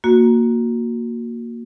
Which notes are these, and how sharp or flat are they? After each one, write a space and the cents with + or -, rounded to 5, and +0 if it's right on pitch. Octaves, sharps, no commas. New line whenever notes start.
A#3 +0 F#4 -20